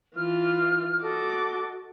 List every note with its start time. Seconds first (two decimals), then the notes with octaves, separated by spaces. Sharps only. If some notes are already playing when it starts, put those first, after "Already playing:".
0.16 E3 F4 F6
1.01 F#4 A4 D#5 D6